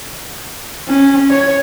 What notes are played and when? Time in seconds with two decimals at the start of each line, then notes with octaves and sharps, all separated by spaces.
0.88 C#4
1.30 C#5